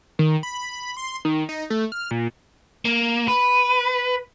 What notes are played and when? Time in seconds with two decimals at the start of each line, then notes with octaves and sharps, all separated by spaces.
0.19 D#3
0.43 B5
0.97 C6
1.25 D#3
1.49 D#4
1.70 A3
1.92 F6
2.11 A#2
2.85 A#3
3.28 B4